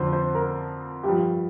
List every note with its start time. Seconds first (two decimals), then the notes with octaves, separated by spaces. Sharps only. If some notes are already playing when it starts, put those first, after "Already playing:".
Already playing: F2 D3 F3 C5
0.13 C5
0.35 A#4
1.03 G2 F3 G4